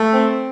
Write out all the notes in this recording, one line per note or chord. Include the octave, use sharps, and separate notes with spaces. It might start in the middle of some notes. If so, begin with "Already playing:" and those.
Already playing: A3
C4